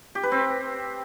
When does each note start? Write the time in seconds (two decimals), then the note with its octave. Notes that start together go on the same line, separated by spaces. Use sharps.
0.15 G4
0.23 B4
0.32 C4